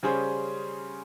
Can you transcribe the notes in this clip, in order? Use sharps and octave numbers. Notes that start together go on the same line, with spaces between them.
C#3 G3 C#4 G#4 C5